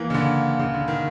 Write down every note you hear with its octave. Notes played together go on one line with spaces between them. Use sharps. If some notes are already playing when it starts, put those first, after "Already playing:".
Already playing: E3 A#3
C#3
D3
C#3
D3
D#3